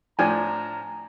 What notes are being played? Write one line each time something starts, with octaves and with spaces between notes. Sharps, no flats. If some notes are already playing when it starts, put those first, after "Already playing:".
A2 F3 D4 G5 G#5 A#5